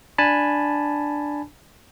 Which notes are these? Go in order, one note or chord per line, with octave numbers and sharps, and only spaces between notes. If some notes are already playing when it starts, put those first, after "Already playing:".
D4 G#5 A5 B5